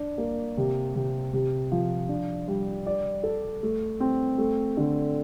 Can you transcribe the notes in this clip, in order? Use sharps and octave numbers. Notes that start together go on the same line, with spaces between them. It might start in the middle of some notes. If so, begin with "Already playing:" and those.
Already playing: D4
A#3
C3
C3
C3
F3
D4
G3
D5
A4
A3
C4
A3
D3